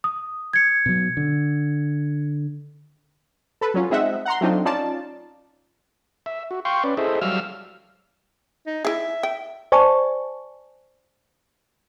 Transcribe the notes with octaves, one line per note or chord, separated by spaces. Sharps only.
D#6
G#6 C#7
B2 F#3
D3
A4 B4
F#3 C#4 F4
G#3 C4 D#4 D#5 E5 F#5
F#5 A#5 C6
F#3 A3 C4 D4 D#4 F4
C#4 D#4 F4 D5 A5
E5
F#4
F5 G5 C6 C#6
C#4 B4 D5
E4 G#4 A4 C5 D#5 E5
F#3 G3 F5 E6 F6
D#4
E4 G#4 E5
G5
C5 D5 G#5 A5 C#6